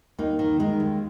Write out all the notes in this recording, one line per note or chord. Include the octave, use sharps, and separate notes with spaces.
D#2 A#3 D#4
D#3
D#3 G#3
D#2